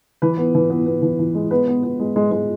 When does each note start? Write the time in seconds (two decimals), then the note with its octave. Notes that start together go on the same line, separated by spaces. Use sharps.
0.22 E3 B4
0.37 B3
0.55 E3
0.70 B3
0.86 B3
1.02 E3
1.19 E3
1.35 G#3
1.51 B3 B4
1.67 B3
1.83 B3
2.00 G#3
2.16 G#3
2.32 G#3